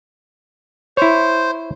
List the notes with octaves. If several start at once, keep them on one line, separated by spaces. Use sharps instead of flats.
E4 C5 C#5